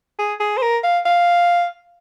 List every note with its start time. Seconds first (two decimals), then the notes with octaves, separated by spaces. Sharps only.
0.19 G#4
0.40 G#4
0.57 C5
0.62 A#4
0.84 F5
1.05 F5